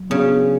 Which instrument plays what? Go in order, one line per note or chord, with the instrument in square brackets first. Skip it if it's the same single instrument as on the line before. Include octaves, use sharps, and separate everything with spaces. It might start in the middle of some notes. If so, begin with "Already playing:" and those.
Already playing: [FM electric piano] F#3
[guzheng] C#3 [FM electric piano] B3 D4 F#4